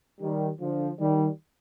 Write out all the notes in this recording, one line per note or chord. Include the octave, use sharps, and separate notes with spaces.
D#3 G3
D3 F3
D#3 G3